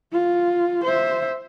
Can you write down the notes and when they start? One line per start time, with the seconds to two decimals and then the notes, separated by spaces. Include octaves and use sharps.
0.12 F4
0.84 C5 E5